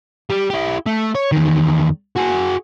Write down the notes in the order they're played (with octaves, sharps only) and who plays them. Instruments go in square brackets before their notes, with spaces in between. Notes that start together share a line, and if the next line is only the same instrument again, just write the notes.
[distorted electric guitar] G3 G4
E4 G4
A3
C#5
E2 D#3
F#4 G#4